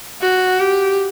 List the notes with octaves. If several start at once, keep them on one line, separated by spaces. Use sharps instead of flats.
F#4
G4